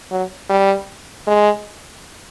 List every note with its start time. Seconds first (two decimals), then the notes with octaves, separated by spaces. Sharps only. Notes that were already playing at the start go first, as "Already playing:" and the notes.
0.12 F#3
0.50 G3
1.27 G#3